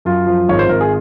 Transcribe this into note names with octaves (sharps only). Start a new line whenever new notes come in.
F#2 F4
F3
G#1 C#5
C5
G#1 A#4
G#4